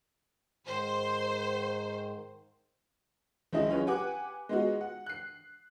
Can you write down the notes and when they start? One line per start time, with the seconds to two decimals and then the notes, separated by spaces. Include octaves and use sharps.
0.66 G#2 D#3 C5
3.53 F#1 C#2 E4 D#5
3.70 C#4 F4 G#4 B4 C#5
3.86 G4 B4 F#5 G#5 D6 F#6
4.49 G#3 B3 D#4 F4 F#4
4.81 F#5
5.06 F#6 C7